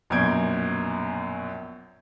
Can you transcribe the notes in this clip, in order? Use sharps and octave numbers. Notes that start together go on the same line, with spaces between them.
A#1 F#2 B2 G6 G#6 D7